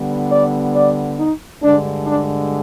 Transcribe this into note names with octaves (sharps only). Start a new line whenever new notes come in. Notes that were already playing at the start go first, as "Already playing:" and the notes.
Already playing: D3 G3 B3
D5
D5
D#4
G2 D3 G#3 D4
D4